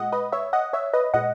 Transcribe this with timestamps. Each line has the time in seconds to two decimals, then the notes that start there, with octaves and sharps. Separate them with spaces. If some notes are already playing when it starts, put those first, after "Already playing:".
Already playing: A#2 G#3 D#5 F#5
0.12 B4 D#5
0.32 C#5 E5
0.53 D#5 F#5
0.73 C#5 E5
0.94 B4 D#5
1.14 A#2 G#3 D#5 F#5